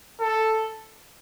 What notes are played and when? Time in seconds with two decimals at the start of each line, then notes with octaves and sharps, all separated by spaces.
0.20 A4